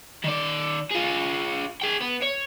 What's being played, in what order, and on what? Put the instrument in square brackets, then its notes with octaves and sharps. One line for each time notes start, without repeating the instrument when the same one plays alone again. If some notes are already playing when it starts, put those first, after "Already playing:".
[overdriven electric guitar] D#3 D5
F4 G#4
G#4 G5
B3
C#5